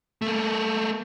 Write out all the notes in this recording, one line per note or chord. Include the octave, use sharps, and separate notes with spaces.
A3 A#3